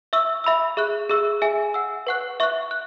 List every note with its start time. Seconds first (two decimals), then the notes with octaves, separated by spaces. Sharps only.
0.13 E5 C#6 E6
0.44 E5 B5 E6
0.77 G#4 E5 C#6 F#6
1.09 G#4 E5 C#6 E6
1.42 G#4 E5 G#5
1.74 F#5 E6
2.07 B4 F#5 C#6 F#6
2.40 E5 C#6 F#6
2.71 F#6